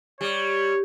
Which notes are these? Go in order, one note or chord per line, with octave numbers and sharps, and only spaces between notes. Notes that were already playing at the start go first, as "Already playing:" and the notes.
G3 C#5